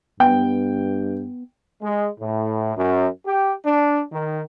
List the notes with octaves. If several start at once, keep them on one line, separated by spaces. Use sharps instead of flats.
G2 B3 G5
G#3
A2
F#2
G4
D4
D#3